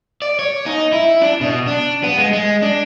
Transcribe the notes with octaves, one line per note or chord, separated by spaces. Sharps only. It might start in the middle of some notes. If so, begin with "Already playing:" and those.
D5
C#5
D#4
E4
D4
B2
D4
B3
G#3
G#3
D4